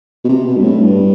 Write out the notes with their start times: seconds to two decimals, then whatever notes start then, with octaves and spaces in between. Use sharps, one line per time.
0.25 B2
0.29 C3
0.46 B2
0.57 G2
0.63 A2
0.80 G2